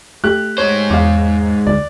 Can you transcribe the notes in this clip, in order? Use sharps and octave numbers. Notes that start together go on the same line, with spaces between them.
A3 G4 F#6
G#2 C5 C#5
E2 F5 D6
D2 D5